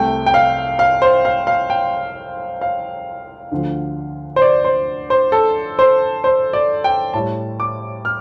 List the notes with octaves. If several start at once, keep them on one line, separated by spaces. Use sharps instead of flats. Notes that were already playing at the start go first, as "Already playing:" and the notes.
Already playing: C2 C3 A3 G5
G5
F5
F5
C5
F5
F5
G5
F5
D2 D3 F3
C5
D5
C5
C5
A4
C5
C5
D5
G5
A2 G3 A5
D6
F6